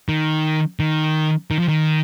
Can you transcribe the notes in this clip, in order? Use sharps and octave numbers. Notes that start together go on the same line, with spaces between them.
D#3
D#3
D#3
F3
D#3